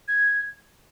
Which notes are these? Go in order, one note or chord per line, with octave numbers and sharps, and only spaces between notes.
G#6